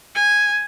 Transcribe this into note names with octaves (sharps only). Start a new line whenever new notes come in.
G#5